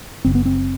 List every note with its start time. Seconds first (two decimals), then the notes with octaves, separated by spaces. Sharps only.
0.25 F#1 F#2 C#3 C4
0.35 B3
0.45 C4